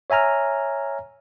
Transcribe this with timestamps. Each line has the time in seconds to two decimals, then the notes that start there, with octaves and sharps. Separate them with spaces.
0.10 C#5 E5 G#5 A#5 F6